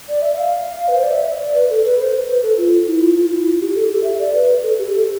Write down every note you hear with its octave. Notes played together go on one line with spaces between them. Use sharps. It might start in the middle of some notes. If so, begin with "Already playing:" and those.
D5
E5
F5
B4
C5
D5
E5
D5
B4
A4
B4
C5
B4
A4
F4
E4
F4
F4
E4
F4
G4
A4
G4
A4
E5
D5
B4
A4
G4
A4